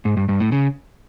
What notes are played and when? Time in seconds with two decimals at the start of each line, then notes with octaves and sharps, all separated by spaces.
0.05 G#2
0.17 G2
0.29 G2
0.40 A2
0.52 C#3